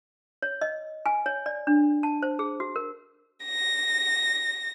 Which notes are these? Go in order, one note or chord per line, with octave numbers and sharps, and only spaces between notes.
C#5
D#5
G#5
C#5
D5
D4
A5
C5
G#4
F#4
A#4
A#6